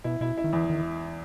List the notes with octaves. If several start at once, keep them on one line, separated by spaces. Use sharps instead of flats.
B2 E4
B2 E4
E4
D#3
E2 E3
D#3